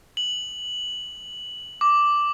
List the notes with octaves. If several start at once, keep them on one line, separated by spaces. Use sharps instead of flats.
F#7
D6